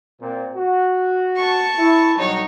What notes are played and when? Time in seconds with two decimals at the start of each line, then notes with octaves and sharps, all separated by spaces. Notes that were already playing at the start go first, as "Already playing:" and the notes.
0.21 A#2 C4
0.56 F#4
1.36 A5 C#6
1.78 E4
2.17 B1 F#3 G3 D#4 C#5